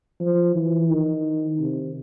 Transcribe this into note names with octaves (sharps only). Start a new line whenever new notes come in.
F3
E3
D#3
C3